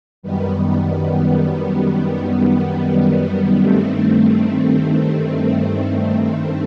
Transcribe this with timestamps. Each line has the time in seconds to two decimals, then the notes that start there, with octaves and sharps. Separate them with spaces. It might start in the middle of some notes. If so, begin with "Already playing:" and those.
0.23 F#2 D#3 G3 B3
3.60 G2 D#3 A3 C4